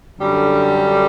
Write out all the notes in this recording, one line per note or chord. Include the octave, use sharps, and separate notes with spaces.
F#2 D3 G3